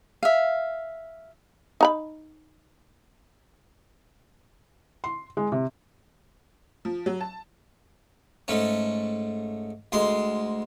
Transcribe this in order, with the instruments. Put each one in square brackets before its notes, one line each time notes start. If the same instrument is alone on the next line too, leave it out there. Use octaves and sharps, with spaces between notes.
[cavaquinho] E5 F5
[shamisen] D#4 A#5 B5
[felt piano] C6
G#3
C3
[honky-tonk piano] F3
F#3
A5
[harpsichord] G#2 A3 C#4
D2 G#3 C6